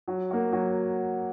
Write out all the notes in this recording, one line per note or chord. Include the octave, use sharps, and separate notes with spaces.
F#3
A#3 F#4
F#3